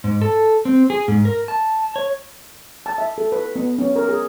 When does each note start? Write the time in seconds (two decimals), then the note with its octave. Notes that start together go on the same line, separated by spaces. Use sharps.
0.04 G#2
0.22 A4
0.65 C4
0.90 G#4
1.08 G#2
1.25 A#4
1.48 A5
1.96 C#5
2.86 A5
2.98 E5
3.18 A4
3.32 B4
3.56 B3
3.78 C#4
3.96 A#4
4.09 G#4